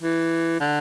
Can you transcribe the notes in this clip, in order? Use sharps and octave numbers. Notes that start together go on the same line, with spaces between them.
E3
D3